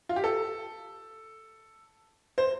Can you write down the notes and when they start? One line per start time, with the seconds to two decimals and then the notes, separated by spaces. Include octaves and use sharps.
0.09 F4
0.16 G4
0.24 A4
2.38 C5